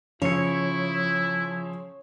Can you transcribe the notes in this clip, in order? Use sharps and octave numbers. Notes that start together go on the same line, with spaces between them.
C#3 F3 E4 C#5 C#7